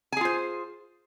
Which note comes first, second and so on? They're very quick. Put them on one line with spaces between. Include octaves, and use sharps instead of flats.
G#5 G#4 F4 C5